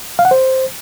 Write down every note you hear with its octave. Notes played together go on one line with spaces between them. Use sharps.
F5
F#5
C5